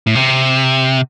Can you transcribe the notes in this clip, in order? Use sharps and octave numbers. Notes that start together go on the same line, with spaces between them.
A2
C3